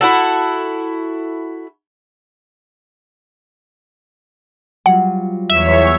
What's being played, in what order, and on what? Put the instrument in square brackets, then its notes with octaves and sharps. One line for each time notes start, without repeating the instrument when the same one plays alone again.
[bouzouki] E4 F#4 A4
[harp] F#3 G3 F4 [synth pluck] F#5
[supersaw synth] E2 C#5 [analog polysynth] E5